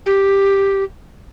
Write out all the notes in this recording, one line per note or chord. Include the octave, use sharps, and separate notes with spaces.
G4